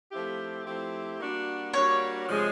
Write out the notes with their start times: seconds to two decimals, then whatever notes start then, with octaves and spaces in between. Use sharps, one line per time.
0.11 F3 A3 C4 E4 G4
0.65 F3 A3 C4 E4 G4
1.20 G3 A#3 D4 F#4
1.74 G3 A#3 D4 F#4 C#5
2.28 C3 F3 G#3